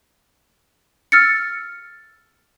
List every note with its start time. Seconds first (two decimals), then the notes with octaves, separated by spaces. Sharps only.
1.12 E6 F6 A6 C#7